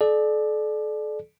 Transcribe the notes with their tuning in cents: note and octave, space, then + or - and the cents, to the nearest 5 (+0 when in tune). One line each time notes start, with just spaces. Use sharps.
A4 -40 D5 +20